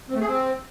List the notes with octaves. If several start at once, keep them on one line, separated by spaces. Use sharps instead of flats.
C4
A3
G#4
C4